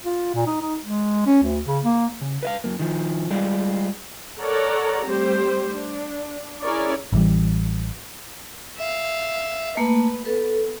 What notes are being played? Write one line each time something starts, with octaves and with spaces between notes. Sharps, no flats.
F4
A#2
D#4
D#4
G#3
C#4
D2
C#3
A#3
C#3
B4 E5 F5
F#2 A#3
D#3 F3
G3 G#3 F4 D5
A4 A#4 C#5 D5 F#5 A#5
G3 A3 C4 G4 C5
D4
C#4 E4 G#4 A#4 C#5 D5
A1 E3 G3
E5 F5
A3 A#3 B4
B3 A4 B4